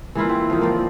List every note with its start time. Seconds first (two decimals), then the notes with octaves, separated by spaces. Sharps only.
0.15 E3 A#3 E4 F4
0.29 C4
0.50 D#3 F3
0.61 A#3 F4 D5